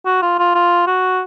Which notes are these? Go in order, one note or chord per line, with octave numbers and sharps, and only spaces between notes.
F#4
F4
F4
F4
F#4